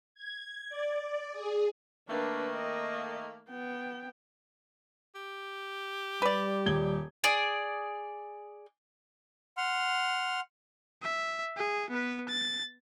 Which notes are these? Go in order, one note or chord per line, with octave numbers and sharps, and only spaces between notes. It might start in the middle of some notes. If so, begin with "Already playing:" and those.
G#6
D5
G#4
D#3 A3 A#3 D4 B4
D#5
B3 G5
G4
G3 B4 D5
D#1 G#6 G7
G#4 D5
F#5 C6 F6
E5
G#4
B3 B4
A6